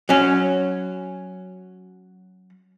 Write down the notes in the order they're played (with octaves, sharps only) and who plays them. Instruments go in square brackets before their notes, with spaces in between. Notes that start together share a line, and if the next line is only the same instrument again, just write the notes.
[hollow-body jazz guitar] F#3 C#4